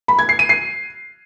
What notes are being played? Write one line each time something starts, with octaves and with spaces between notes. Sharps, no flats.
B5
G#6
C7
D#7
C7